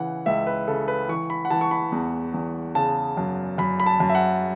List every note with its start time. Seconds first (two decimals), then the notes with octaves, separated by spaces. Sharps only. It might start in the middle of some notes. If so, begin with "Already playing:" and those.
Already playing: C#3 E3 F#5
0.26 C#2 E5
0.47 B4
0.68 C#3 A4
0.88 B4
1.09 E3 C#6
1.30 B5
1.45 F#5
1.50 E3 A5
1.61 C#6
1.71 B5
1.92 E2
2.34 E2
2.75 C#3 A5
3.17 F#2
3.58 F#2 B5
3.80 B5
3.86 A5
4.00 F#2
4.09 E5
4.15 F#5